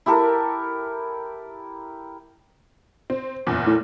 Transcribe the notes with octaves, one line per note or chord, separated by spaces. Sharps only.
E4 G4 A4 A#4
C4
F#1 E2 A#2
A2